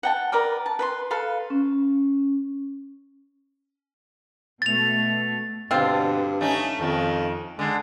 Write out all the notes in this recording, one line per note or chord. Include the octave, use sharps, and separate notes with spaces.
F#5 G5 A5
A#4 B4 D5 G5
A5
B4 B5 C6
A4 B4 F5
C#4
B2 A3 A6 F7
G2 B2 D3 C4 F4
A3 C#4 D#4
F2 D#3
D3 G#3